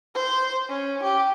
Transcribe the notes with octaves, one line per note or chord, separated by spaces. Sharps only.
C5
C#4
G4